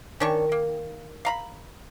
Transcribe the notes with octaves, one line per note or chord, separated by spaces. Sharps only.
D#3 C#4 D4 C#6
A#3
F5 A#5 B5